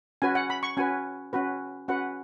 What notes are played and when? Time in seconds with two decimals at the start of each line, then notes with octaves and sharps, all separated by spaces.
0.22 C#4 F#4 B4 G#5
0.35 F#5
0.50 B5
0.63 C#6
0.77 C#4 F#4 B4 G#5
1.33 C#4 F#4 B4
1.88 C#4 F#4 B4 F#5